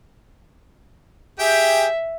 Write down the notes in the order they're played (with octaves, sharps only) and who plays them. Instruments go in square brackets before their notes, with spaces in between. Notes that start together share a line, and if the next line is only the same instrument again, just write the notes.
[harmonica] G4 G#4 G5 [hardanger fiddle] E5